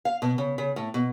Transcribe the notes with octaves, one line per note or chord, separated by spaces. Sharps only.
F5
B2
C#3
C#3
A2
B2